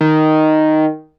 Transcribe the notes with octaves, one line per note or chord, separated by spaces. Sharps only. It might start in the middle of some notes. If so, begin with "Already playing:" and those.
D#3